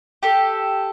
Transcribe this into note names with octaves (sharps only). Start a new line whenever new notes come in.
G4 A4